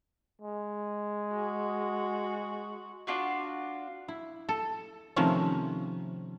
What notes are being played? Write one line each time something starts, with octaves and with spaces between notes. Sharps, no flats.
G#3
F#4
D4 F4 F#4
E4
A4
C3 D#3 F3 A3 C4 C#4